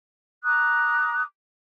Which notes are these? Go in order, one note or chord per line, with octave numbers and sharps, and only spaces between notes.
A#5 D6 D#6 F#6